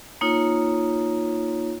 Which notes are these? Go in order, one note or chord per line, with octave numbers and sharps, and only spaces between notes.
A#3 D#4 F4 C#5